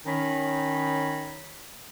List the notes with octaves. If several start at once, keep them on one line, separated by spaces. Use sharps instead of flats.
D#3 C#4 D#4 C#5 B5